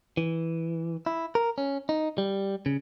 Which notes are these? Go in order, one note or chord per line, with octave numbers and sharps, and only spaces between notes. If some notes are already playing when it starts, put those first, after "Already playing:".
E3
E4
A#4
C#4
D#4
G3
C#3